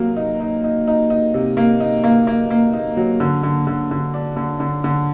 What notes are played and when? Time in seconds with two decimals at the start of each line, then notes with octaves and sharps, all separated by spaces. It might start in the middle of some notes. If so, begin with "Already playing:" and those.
Already playing: C3 F#3 A#3
0.17 D#4
0.41 D#4
0.64 D#4
0.88 D#4
1.10 D#4
1.34 C3
1.57 A#3
1.80 D#4
2.04 A#3
2.27 A#3
2.50 A#3
2.74 D#4
2.97 F#3
3.20 D3
3.43 D3
3.67 D3
3.91 D3
4.14 D4
4.37 D3
4.60 D3
4.84 D3